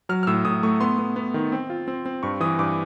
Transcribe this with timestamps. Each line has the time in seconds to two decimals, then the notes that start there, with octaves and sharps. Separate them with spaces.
0.09 F#3 F6
0.23 F6
0.27 A2 E6
0.45 A2 D#6
0.63 A3 C#6
0.81 B3 C6
0.98 B3
1.16 B3
1.34 D#3
1.52 C4
1.70 F4
1.88 C4
2.06 C4
2.23 G2 C#6
2.40 E3 D#6
2.59 G2 D6